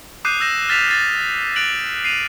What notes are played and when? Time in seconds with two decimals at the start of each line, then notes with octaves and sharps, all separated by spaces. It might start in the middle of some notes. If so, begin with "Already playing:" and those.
0.25 D6 D#6 F#6 G6 C7 D#7
0.40 E6 G6 A#6 E7
0.69 F6 A6 B6 E7 F7
0.87 A6 C7 D#7
1.56 F#6 A6 D7 F7 F#7
2.04 C7 D#7 F7